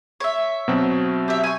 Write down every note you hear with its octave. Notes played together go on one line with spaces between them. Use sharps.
C#5 E5
B2 F#3 C4
G4 E5
G#5 C#6